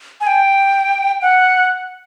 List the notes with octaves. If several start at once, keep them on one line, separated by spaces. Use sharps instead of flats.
G#5
G5
F#5